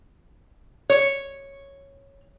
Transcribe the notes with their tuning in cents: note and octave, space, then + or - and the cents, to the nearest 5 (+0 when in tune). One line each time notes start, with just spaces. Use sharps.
C#5 -5